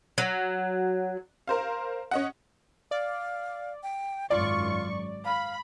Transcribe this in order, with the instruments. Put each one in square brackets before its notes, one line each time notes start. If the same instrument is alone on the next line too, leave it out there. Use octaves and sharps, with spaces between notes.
[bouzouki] F#3
[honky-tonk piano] A#4 C5 F5
C#4 D#5 F#5
[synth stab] D5 [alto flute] F5
[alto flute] G5
[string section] G#1 F#2 C#6 [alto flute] F4 [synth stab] D5
[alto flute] F5 [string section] B5